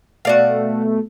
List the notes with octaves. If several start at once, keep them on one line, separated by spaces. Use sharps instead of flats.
B2 A3 F#4 D5 F5